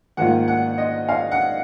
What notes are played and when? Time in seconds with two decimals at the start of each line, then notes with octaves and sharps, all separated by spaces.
0.17 G#2 D#3 A#3 F4 F#5
0.48 F#5
0.78 D#5
1.09 F5
1.31 F#5